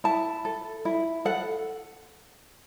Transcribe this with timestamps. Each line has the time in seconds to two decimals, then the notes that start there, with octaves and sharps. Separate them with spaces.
0.04 E4 A5
0.45 A4
0.85 E4
1.25 A4 F#5